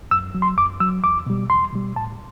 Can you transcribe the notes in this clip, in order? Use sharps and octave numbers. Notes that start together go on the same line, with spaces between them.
F#2 E6
F#3
C6
F#2 D6
F#3 E6
E2 D6
B2 G3
E2 C6
B2 G3
A2 A5